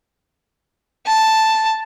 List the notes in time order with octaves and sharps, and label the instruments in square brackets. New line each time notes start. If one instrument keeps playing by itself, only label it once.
[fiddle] A5